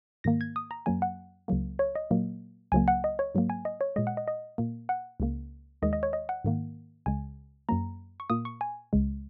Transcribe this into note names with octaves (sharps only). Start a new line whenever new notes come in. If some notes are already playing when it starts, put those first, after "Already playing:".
G#2 D#3 A#3 A#6
G#6
D#6
A#5
F#2 F#3 A#3 G#5
F#5
C#2 C#3 F#3 A#3
C#5
D#5
A#2 F#3 A#3
C#2 C#3 F#3 A#3 G#5
F#5
D#5
C#5
G#2 F#3 A#3
G#5
D#5
C#5
A#2 G#3 D#5
F#5
D#5
D#5
A#2 A#3
F#5
C#2 C#3 A#3
D#2 D#3 G#3 D#5
D#5
C#5
D#5
F#5
G#2 D#3 A#3
C#2 C#3 G#3 G#5
F#2 F#3 A#3 A#5
C#6
A#2 A#3 D#6
C#6
G#5
C#2 C#3 G#3